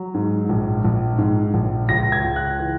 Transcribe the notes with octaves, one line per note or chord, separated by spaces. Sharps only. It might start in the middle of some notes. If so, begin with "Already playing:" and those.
Already playing: F#3
G#2
A#1
A#1
G#2
A#1
C#2 A#6
G#6
C#2
F#6
E3